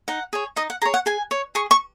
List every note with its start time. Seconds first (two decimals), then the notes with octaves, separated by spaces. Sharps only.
0.08 D#4 F#5
0.33 G#4 C#5
0.56 D#4 D#5
0.70 F#5
0.82 G#4 C#5 A#5
0.94 F#5
1.06 G#4 G#5
1.31 C#5
1.55 G#4 C#6
1.71 C#6